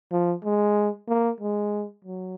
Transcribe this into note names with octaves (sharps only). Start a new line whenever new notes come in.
F3
G#3
A#3
G#3
F#3